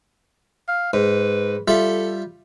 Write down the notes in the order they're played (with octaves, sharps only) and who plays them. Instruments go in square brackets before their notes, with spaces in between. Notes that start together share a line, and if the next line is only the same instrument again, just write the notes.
[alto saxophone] F5
[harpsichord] G#2 [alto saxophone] B4
[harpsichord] G3 F4 E5 [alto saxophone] A4